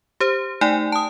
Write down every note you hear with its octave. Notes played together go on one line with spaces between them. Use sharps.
G4 C5
A3 D#4 D5 G5 G#5
A5 D#6